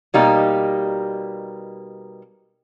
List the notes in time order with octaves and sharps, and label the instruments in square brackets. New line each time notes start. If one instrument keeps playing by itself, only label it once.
[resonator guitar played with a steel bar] B2 G3 A#3 D#4 G4